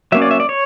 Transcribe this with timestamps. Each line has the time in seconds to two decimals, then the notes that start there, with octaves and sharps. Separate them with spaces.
0.12 F#3 A#3 C#4 E5
0.22 D5
0.31 E5
0.40 D5
0.49 C#5